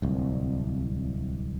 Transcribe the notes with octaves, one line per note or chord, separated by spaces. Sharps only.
D1 C2